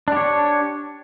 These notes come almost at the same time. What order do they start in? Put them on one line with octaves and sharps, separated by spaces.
D4 G4 C#5